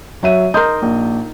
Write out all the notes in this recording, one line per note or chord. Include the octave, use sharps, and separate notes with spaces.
F#3 E5 D#7
D#4 A#4 C6 G6
A#1